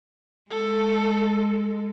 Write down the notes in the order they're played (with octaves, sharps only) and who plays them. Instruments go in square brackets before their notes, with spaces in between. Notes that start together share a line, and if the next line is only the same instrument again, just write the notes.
[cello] G#3 [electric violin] A4